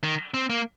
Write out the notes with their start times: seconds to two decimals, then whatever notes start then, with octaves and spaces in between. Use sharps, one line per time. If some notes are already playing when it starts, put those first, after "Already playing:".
0.03 D#3
0.34 C4
0.50 A#3